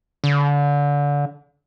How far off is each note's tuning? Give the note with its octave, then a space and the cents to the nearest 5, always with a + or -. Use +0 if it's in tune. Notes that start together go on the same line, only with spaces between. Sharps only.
D3 -30